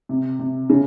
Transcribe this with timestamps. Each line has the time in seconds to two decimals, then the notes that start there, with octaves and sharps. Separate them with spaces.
0.09 C3
0.39 C3
0.70 C#3